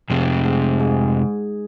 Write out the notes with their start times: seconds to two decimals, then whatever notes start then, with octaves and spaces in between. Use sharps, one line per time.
0.10 F2 G#2 C3
0.45 G#2
0.80 G#2